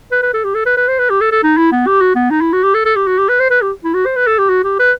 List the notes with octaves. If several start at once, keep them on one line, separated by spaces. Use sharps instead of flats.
B4
B4
A4
G4
A4
B4
B4
C5
B4
G4
A4
A4
D#4
E4
B3
G4
F#4
B3
D#4
E4
F#4
G4
A4
A4
G4
F#4
G4
B4
C5
B4
G4
E4
F#4
C5
B4
A4
G4
F#4
G4
B4